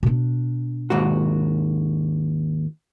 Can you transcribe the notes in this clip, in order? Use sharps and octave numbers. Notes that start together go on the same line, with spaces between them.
B2 D4
D#2 G#2 F#4